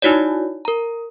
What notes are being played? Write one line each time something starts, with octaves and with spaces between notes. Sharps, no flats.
D#4 E4 F#4 C#5 D5
A#4 A#5